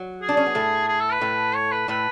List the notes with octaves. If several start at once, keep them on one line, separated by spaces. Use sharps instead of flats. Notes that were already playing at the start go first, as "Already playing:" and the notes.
Already playing: F#3
G#4
D4
C#4
B3
A2 A3
G#4
A4
B4
A2 A3
C#5
B4
A2 A3 B4